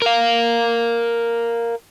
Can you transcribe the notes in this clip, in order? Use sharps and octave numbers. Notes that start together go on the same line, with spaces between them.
A#4 F5